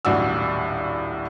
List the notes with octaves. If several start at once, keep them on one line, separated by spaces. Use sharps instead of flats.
D#1 B1 A2 D4 F#4 E6